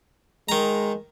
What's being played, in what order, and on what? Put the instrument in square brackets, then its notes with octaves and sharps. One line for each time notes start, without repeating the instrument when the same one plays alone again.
[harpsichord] D#3 A#5 [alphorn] G#3